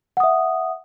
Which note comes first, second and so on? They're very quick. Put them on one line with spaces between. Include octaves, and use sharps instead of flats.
F#5 D#6 E5